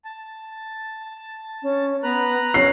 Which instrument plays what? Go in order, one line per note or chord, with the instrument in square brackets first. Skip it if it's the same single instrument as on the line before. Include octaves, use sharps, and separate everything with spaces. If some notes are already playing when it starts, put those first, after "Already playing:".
[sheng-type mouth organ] A5
[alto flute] C#4
[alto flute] B3 [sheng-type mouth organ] B4 A#5 F#6
[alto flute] C#4 [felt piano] C7